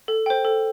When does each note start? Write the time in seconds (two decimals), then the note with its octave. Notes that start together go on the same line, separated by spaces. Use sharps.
0.08 A4
0.26 C5 G5
0.45 A4